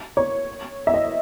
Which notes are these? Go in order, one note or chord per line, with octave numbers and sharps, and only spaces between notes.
C#5
E5
D#5